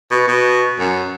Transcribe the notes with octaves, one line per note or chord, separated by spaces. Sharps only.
B2
B2
F#2